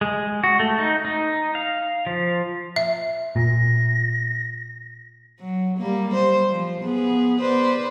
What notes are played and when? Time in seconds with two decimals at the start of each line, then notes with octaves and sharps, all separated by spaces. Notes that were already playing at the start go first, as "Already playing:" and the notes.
0.01 G#3
0.44 F#4
0.60 A3
0.78 D#4
1.05 D#4
1.55 F5
2.07 F3
2.76 E5
3.36 A#2 A#6
5.39 F#3
5.77 G3 A#3
6.14 C5
6.51 F3
6.81 B3 G#4
7.41 B4 C5 D5